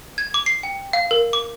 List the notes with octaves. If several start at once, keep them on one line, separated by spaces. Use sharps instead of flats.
G#6
D6
C7
G5
F5
A#4
D6